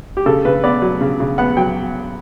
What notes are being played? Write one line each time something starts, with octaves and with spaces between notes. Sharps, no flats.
G4
C#3 A4
C#3 B4
B3 D5
F#3
C#3
C#3
B3 F#5
F#3 G5